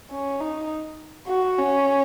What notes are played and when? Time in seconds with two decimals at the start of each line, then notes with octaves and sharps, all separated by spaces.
0.11 C#4
0.40 D#4
1.28 F#4
1.58 C#4